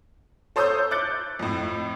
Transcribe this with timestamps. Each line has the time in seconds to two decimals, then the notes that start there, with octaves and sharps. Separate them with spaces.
0.56 A4 C5 C#5 D#6 E6 G6
0.91 D6 F#6 G6 A6 C#7
1.39 F2 A2